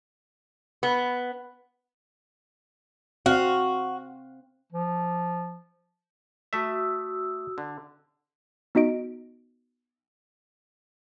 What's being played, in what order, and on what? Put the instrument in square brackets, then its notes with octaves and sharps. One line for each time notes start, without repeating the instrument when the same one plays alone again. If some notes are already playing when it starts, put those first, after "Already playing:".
[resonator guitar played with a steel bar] B3
[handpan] C4 F5 [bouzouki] F#4
[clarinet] F3
[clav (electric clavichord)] A3 E5 [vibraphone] F#4 D#6 E6
[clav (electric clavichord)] D3
[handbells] B3 D#4 F#4 D#5 D7